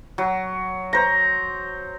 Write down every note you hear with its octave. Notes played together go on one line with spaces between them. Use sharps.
F#3
C5 A#5